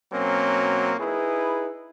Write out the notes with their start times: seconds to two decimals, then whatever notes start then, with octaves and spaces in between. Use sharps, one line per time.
0.13 B2 F#3 A#3 C4 C#4
1.00 D#4 E4 G#4 B4